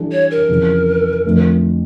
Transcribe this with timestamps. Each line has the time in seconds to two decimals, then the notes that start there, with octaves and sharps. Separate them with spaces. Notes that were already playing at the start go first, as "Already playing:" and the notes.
Already playing: E3 G3 D4 A4
0.12 C#5
0.31 A#4
0.49 F2 C#3 E3
1.25 F2 D3 A3